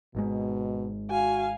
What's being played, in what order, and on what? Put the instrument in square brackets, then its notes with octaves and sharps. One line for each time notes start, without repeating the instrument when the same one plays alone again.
[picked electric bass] G#1 G#2 G#3 [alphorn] B2
[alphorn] F#4 [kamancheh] F5 G#5